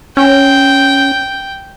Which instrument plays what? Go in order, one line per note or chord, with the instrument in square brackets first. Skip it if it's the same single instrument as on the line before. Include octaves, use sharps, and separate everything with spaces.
[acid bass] C#4 [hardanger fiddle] G5